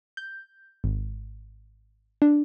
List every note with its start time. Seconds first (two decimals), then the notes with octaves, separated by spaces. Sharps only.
0.17 G6
0.84 G#1
2.22 D4